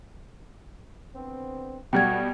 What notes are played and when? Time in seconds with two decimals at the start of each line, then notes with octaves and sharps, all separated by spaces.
1.15 D3 B3 C4
1.93 B2 F#3 G3 A3 F#4 G5 G#6